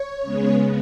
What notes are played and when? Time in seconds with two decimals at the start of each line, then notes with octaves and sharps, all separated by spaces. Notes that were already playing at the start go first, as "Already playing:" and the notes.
Already playing: C#5
0.21 C#3 G#3 B3